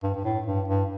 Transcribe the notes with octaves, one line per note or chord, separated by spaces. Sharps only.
G2
G2
A2
G2
G2